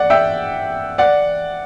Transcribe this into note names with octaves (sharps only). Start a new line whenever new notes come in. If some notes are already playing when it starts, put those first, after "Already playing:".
Already playing: D5 F#5
E5 G5
D5 F#5